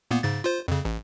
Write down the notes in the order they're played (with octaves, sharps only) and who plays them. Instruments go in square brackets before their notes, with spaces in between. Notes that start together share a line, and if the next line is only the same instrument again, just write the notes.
[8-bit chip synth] A#2 A#3 B3
G#2 C#3 A6
F4 C5
F2 C#3
A1